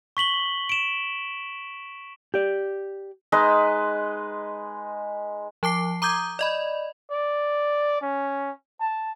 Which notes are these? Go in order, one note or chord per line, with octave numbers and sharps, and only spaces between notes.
C#6 B6 F#7 G7
D7 E7
G4 D5
G#3 D#4 B4 D#5
F3 A5 D6 C7
A#5 D6 D#6 G6 G#6
D5 D#5 B5
D5
C#4
A5